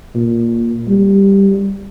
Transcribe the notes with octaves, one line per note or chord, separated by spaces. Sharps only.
A#2
G3